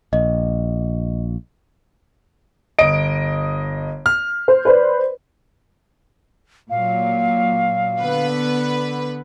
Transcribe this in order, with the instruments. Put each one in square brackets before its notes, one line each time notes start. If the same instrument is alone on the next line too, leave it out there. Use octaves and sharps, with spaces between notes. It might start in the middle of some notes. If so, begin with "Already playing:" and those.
[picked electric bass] A#1 [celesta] D#5
[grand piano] G1 D#5 [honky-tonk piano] D7
[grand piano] F6
[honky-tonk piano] C5
B4 C5 D5
[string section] A#2 F#3 [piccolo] F5
[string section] D3 B3 B4